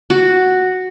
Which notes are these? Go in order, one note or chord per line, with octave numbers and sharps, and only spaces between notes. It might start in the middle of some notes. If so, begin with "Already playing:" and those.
F#4